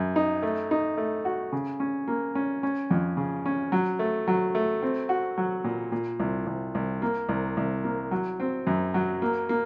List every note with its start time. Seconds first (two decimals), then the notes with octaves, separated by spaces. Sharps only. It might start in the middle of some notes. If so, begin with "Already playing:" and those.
Already playing: F#2
0.16 D#4
0.42 A3
0.71 D#4
0.97 A3
1.25 F#4
1.52 C#3
1.80 C#4
2.07 A#3
2.35 C#4
2.63 C#4
2.91 F2
3.17 C#3
3.46 C#4
3.72 F#3
3.99 A3
4.28 F#3
4.55 A3
4.82 C4
5.09 F#4
5.38 F#3
5.64 A#2
5.92 A#2
6.20 C2
6.47 C2
6.75 C2
7.02 A#3
7.29 C2
7.57 C2
7.84 A#3
8.11 F#3
8.40 C4
8.67 F#2
8.94 F#3
9.22 A#3
9.49 A#3